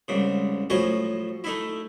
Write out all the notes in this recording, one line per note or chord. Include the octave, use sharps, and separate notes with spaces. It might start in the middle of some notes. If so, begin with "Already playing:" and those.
C2 G#2 C#3
A2 F3 F#3 D#5 G#5 C#6
A3 D#4 E4